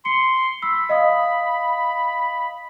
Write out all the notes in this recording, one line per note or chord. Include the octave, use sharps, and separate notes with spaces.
C6 C#7
B5 E6
D#5 F5 D#6